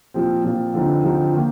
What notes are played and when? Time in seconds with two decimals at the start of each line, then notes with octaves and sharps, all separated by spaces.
0.14 A#2 F3 C4
0.44 A#2 F3 C4
0.74 D3 F3 C4 D#4
1.04 D3 F3 C4 D#4
1.33 D#3 A#3